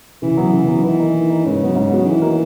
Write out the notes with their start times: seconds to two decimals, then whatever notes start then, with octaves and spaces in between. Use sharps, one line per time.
0.22 C#3 E3
0.37 F#3 B3
0.53 C#3
0.68 F#3 B3
0.83 D#3 E3
1.00 A#3 D#4
1.14 D#3
1.30 A#3 D#4
1.45 G#2 C#3
1.60 F#3 B3 F#4
1.75 G#2
1.91 F#3 B3 F#4
2.06 D#3 E3
2.22 A#3 D#4 F#4